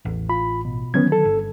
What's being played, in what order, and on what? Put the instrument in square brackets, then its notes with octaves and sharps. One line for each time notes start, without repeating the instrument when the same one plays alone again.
[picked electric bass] A1 [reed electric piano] E2
[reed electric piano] F4 B5
B2
[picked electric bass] D3 D#3 F#3 [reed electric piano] B3 C#4 G#6
[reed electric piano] A4
[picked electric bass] G1